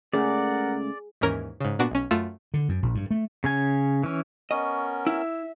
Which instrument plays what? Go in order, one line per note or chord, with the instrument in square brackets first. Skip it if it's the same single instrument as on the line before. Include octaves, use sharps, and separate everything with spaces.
[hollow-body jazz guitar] C#2 C#3 A3 [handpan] G#4 [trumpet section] A#4 F#5 [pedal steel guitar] D5
[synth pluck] D#2 G#2 E3 C#4 A#4
G#2 C#3
A#2 B3 D4 F#4 D6
B1 C#4
F#2 A3 F4 E6
[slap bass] D3
F#2
A#1
G2
A3
[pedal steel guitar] C#3 C#4 G#5
E3 C#4
[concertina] B3 C#4 A#4 [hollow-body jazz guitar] D#5 [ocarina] C#6
[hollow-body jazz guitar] E4 [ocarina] E5